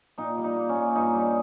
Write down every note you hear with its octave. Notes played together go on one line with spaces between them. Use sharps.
A#2 D#4
G3
D#4
A#3
C#4
A#2
G2 D#4
G3